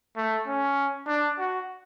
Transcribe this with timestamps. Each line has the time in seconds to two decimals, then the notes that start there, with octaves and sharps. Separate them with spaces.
0.17 A3
0.47 C#4
1.07 D4
1.39 F#4